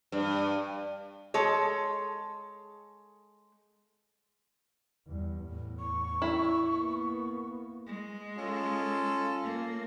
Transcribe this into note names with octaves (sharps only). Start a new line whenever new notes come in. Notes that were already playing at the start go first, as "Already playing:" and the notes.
G2
G#3 A4 C#5
E2 G3
E2 A2
C#6
E4
A#3 B3
G#3
C#4 F4 A4
A#3